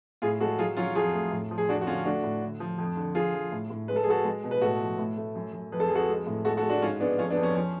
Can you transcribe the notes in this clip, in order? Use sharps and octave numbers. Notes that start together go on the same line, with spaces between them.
A2 F4 G#4
G#3 F#4 A4
F#3 F4 G#4
F#3 C#4 F4
F2 F4 G#4
A3
A2
F3
G#4
F2 D4 F#4
F#4
D3 C#4 F4
A3 D4 F#4
A2
D3
F3
F2
D3
F3 F4 G#4
F3
A2
A2
G#3 B4
A4
G#4
G#3 F#4 A4
G#3
B2
B4
A2 F#4 A4
F3
A2
A3
F#2
F#2
F2 B4
A4
F2 G#4
F#4 A4
G#3
A2
G#3 F#4 A4
F#4 A4
G#3
D4 F#4
G#2 C#4 F4
G#3 B3 D4
F2 C#4 F4
B3 D4
F2
C#4
F3 C#4